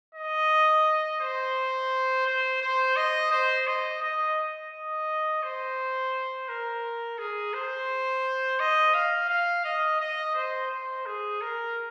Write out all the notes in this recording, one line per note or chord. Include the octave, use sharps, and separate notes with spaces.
D#5
C5
C5
C5
D#5
C5
D#5
D#5
D#5
C5
A#4
G#4
C5
D#5
F5
F5
D#5
D#5
C5
C5
G#4
A#4